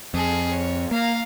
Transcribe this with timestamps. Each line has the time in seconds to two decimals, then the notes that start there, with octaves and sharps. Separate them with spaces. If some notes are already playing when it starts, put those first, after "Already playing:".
0.14 F2 G#4 A4
0.51 C#5
0.91 A#3 F5 A#5